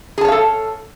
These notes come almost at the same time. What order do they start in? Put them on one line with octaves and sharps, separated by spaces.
G#4 A5 C#5 F5 A4